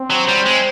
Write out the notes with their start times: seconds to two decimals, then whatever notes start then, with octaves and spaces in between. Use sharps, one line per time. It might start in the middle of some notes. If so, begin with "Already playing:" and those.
Already playing: C4
0.10 F#3
0.28 G3
0.46 G#3